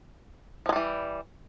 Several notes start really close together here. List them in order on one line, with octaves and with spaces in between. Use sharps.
F3 G#3 G3 E3